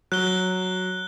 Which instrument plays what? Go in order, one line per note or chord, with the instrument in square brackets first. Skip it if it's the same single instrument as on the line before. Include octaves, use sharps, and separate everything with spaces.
[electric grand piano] F#3 [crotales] F#6 G7